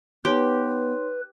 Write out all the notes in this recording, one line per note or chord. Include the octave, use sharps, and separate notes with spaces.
B3 D#4 G4 B4 C#5 C6